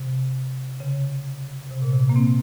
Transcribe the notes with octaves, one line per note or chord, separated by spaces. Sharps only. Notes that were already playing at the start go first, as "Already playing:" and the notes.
Already playing: C3
C#3
C3
A#2
C3
A#3
C4